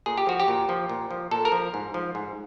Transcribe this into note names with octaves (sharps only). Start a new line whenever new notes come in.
A#2 G#4
G4
F3 F#4
G4
A#2
F3
A#2
F3
A#2 A4
A#4
F3
G#2
F3
G#2